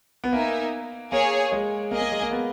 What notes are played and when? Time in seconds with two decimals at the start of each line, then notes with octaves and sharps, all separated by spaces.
0.24 B3
0.33 A#3 D#4 A#4 E5 G#5
1.12 A#3 G#4 C#5 G#5
1.52 G#3
1.91 A#3 G#4 D#5 G#5
2.01 A#3
2.12 G#3
2.22 A#3
2.31 B3